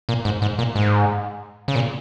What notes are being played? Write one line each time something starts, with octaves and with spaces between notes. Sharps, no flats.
A#2
G#2
G#2
A#2
G#2
C#3
A#2